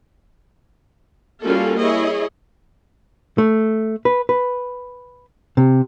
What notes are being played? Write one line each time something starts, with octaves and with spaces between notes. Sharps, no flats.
G3 A#3 C#4 F4 F#4 A4
E4 G#4 C#5 D#5
A3
B4
B4
C3